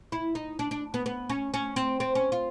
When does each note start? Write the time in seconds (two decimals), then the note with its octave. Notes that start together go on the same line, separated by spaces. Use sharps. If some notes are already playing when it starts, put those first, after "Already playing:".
0.12 E4
0.35 D#4
0.59 D4
0.71 D4
0.94 B3
1.06 B3
1.29 C#4
1.54 C#4
1.76 C4
2.00 C4
2.15 C#4
2.32 F4